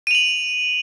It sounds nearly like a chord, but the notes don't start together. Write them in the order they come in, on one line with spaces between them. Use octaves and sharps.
D#7 F7 F#7